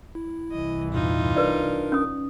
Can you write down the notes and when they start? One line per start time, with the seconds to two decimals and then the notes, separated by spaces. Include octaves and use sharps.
0.15 E4
0.51 C2 E3 D#5
0.92 E2 G2 A#2 D#4 F4
1.36 D4 A#4 B4 D5
1.92 C#4 D#6